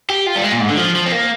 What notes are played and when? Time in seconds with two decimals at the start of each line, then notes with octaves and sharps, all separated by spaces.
0.10 G4
0.27 F4
0.36 G3
0.43 G#3
0.52 A#2
0.61 G#2
0.69 D3
0.77 F3
0.95 F3
1.06 C4
1.12 A#3